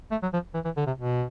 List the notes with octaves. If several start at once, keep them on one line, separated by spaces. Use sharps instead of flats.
A3
F#3
F3
E3
E3
D3
C3
B2